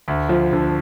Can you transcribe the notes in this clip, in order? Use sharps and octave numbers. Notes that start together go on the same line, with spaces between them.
D2
F3
D3